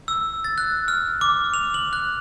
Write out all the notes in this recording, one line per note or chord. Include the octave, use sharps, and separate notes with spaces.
E6
A6
F#6
F6
D6
F7
F#7
F#6